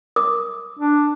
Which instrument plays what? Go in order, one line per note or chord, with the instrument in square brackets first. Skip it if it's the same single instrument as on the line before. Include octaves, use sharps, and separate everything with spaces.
[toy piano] A#4 D6 D#6
[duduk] D4